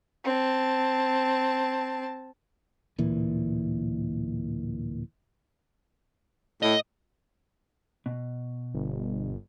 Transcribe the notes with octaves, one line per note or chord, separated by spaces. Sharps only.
C4 A5
D1 A#2 E3
A2 D#5
B2
G1